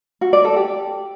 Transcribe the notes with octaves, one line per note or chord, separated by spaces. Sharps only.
F#4
D5
A4
G4